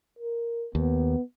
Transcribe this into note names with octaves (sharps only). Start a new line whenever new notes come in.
A#4
D#2 B3